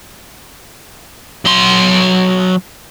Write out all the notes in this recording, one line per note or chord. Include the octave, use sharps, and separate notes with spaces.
F#3 C6